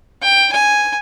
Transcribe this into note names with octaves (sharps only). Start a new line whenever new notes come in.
G5
G#5